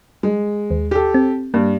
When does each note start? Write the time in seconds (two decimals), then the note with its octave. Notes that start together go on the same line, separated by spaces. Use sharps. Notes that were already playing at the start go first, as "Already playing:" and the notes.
0.23 G#3
0.71 D#2
0.91 G4 A4
1.14 C4
1.54 G2 A#3